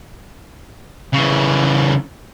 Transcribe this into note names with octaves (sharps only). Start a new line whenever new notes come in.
C#3 E3